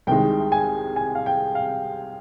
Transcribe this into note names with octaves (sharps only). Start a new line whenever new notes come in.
C2 C3 D#3 G#3 G5
G#5
G#5
F5
G5
F5